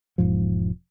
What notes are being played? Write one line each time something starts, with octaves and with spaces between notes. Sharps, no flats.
E1 G#2 F3